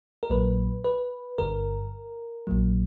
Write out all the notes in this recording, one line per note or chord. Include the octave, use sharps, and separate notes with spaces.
A#4
A#1 A#2 F#3 B4
B4
G1 G2 D3 A#4
A#1 A#2 F#3